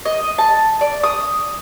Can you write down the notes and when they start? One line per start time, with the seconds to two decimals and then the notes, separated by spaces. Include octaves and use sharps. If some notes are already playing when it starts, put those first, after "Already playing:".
0.05 D#5
0.38 A5
0.81 D5
1.04 D#6